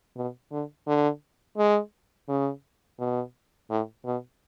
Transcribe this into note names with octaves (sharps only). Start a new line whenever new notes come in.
B2
D3
D3
G#3
C#3
B2
A2
B2